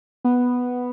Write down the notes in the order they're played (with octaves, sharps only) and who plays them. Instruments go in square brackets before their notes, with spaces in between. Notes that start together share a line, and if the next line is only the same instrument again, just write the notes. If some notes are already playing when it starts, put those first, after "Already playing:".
[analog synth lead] B3